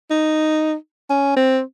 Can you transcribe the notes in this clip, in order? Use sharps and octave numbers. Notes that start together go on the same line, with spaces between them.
D#4
C#4
C4